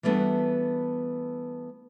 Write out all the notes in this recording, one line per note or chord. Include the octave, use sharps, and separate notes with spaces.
E3 G3 A3 B3 D4 F#4